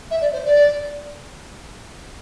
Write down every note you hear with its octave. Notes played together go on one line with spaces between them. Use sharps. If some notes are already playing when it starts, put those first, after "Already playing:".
E5
D5
C5
D5